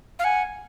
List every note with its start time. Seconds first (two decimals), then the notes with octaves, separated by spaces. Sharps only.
0.19 F5
0.24 F#5 G#5